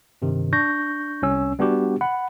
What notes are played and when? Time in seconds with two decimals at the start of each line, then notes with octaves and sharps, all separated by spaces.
0.22 G2 C3 D#3
0.53 D4 C#6 G6 A#6
1.22 C2 C#4 E6
1.59 G3 B3 D4 F#4 G4
2.01 F#5 B5